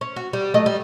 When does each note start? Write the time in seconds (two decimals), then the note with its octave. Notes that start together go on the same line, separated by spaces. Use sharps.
0.01 C#4
0.16 F#4
0.33 G3
0.54 F#3 A3 D#5
0.66 G3